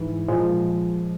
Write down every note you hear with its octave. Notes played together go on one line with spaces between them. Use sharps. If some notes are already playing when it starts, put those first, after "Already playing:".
Already playing: G#2 E3
A#2 F3 G#3